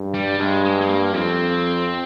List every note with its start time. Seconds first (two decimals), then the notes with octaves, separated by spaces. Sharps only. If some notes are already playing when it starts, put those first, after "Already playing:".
Already playing: G2
0.14 G3
0.39 G2 G#3
0.65 G#3
0.81 G#3
0.89 A#3
1.14 F2 C4